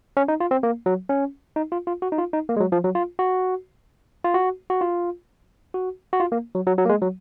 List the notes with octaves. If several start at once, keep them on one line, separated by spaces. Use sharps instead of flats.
C#4
D#4
F4
C4
A#3
F#3
C#4
D#4
F4
F4
F#4
D#4
F4
D#4
A#3
G#3
F#3
F3
F#3
F4
F#4
F4
F#4
F#4
F4
F#4
F#4
F4
A#3
F#3
F#3
F#3
A#3
G#3
F#3